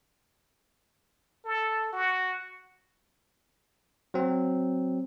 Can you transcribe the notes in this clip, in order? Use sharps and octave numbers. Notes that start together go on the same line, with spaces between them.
A4
F#4
F#3 C4